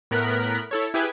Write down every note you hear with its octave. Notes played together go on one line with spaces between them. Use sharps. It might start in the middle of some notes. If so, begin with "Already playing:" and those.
A2 B3 A#4 F#6 B6
E4 A4 C#5
E4 G4 G#4 B4 G#5